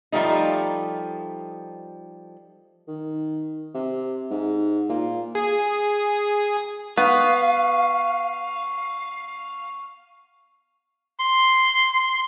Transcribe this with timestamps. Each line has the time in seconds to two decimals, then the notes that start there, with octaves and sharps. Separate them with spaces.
0.12 F3 G3 A3 D#4
2.88 D#3
3.74 C3
4.30 G#2
4.89 A#2
5.35 G#4
6.97 B3 F5 C#6
11.20 C6